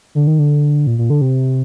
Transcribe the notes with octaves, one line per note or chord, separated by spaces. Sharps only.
D3
D#3
D3
A#2
A#2
D3
C3